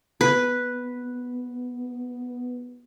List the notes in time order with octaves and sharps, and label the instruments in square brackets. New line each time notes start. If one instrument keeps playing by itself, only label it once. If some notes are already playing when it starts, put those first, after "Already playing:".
[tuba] B3 [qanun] B4